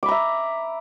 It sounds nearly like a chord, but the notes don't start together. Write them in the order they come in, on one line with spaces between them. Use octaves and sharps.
D6 B5 A#5 E5